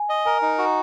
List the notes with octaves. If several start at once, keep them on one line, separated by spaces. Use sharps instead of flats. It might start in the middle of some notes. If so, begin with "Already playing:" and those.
Already playing: G#5
D#5
A#4 G#5
D#4
F#4